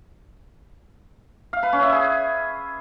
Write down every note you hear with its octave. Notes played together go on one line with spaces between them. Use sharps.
F5
B4
C#4
E5
G#4